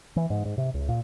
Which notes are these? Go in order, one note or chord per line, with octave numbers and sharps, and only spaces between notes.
E3
G#2
G#2
C3
C#2
A#2